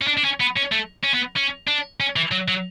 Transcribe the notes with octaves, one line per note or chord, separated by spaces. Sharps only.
C#4
D4
D4
C#4
B3
C#4
A3
C#4
B3
C#4
D4
C#4
E3
F#3
F#3